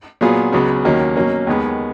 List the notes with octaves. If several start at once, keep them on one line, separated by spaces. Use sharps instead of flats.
A#2 F#3 B3 F4 G#4
C#2 C#3 F#3 B3
D#2 D#3 F#3 A#3 C#4
B2 F#3 A#3 C#4
D#2 D#3 G#3 B3